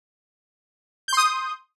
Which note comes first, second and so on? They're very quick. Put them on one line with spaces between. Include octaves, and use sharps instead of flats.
G6 C6 D#6